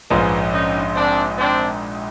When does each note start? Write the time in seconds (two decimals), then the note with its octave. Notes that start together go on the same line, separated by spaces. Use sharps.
0.11 A#1 G#2 F3 G#3 B3 C#4
0.52 C#4 D#4
0.96 C4 D4
1.38 C4 D4